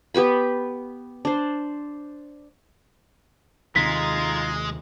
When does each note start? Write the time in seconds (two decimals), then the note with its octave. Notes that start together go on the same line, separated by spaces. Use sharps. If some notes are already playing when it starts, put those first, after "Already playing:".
0.14 B3 G4 B4 B5
1.25 D4 C5
3.76 D#2 C3 D#3 G#3 D#4 F4 A#5 B6